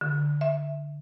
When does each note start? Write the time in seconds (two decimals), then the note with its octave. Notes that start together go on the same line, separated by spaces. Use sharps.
0.01 D3
0.41 E5